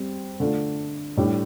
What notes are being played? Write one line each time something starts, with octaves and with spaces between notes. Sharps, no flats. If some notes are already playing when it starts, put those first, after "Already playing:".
Already playing: G3 C4
D3 A3 D4 F4
A2 G3 D4 G4